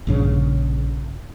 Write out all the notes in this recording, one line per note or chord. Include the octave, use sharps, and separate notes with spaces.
A#1 G2 C#3